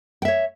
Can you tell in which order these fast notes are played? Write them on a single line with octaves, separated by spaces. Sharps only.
G5 E5 C#5